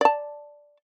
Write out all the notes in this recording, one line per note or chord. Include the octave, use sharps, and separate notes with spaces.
D5 A5